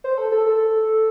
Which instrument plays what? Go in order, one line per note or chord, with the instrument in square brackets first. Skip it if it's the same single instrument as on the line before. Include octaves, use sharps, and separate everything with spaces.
[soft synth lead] C5
A4
A4
A4